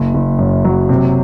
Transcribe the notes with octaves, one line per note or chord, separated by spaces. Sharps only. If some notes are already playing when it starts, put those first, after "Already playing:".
Already playing: F#1
F#1
F#2
F#3
C3